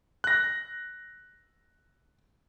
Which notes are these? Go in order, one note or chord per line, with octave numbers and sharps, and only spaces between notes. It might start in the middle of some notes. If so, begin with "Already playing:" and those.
F#6 A#6